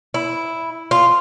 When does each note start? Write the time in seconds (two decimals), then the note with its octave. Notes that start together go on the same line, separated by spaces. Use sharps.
0.14 E4
0.91 F4